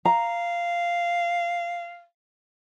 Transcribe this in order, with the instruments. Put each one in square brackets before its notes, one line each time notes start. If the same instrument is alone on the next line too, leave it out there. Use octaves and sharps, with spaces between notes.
[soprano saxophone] F5 [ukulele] A#5